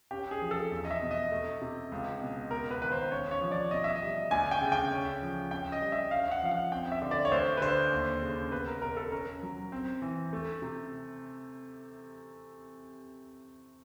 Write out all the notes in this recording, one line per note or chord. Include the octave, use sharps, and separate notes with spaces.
C#4 G4
G#4
F3
A4
E2
D#5
E5
B2
D#5
A3
C3
C#2
B2
B3 A#4
B4
D#3 B4
C5
C#4 C#5
C#5
F3
D5
B2 D#5
E5
D#5
G3
D2 G#5
G5
C#3
G5
C#4
F3
C#4 G5
D#5
G3
E5
C#4 F5
F#5
F3 F5
F#5
C4 G5
E5
D3
D5
C#5
D2 C5
B4
D3 C5
D#2
C#3
B3 B4
A#4
B2 A#4
A4
C#4 A#4
F#3
C4
E3
A3
C3